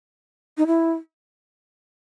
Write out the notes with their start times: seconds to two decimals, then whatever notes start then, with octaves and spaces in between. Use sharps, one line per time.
0.58 D#4
0.67 E4